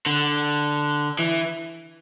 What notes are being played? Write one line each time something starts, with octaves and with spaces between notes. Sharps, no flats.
D3
E3